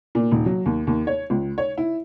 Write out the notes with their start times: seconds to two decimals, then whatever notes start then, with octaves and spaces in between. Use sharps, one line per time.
0.15 A#2
0.31 D#1
0.46 F#3
0.66 D#2
0.87 D#2
1.07 C#5
1.30 C#2
1.58 C#5
1.78 E4